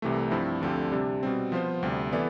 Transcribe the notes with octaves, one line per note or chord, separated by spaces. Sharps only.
C2 C3 E3 A3
G2 F3 C4 E4
D2 D3 F3 C4 G4
C3 G3 D4
B2 G3 C4
F3 B3 F4 C5
D2 C3 G3
E3 B3 E4 A4 D5